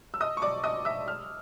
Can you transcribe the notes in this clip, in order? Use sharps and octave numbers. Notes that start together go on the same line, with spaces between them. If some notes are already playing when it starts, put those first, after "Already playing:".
E6
D#5 D#6
C#6
D5 D6
D#5 D#6
E5 E6
F6